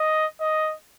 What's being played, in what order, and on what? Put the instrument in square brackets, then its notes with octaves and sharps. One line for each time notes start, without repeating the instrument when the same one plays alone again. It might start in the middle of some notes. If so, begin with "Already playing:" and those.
Already playing: [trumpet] D#5
D#5